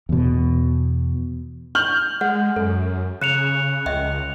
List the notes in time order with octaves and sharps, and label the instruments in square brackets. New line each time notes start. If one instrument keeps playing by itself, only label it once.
[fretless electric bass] E2 B2
[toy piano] C#6 [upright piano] F6 G6 F#7
[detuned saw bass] G#3 [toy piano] F#5
[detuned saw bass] F#2 [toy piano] A4
[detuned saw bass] C#3 [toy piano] A#5 [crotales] F#6 C#7 F7
[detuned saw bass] C#2 [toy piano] D#5 E5 G5